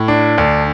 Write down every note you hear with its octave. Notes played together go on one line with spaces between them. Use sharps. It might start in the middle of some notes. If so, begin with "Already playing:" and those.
Already playing: A2
D4
D2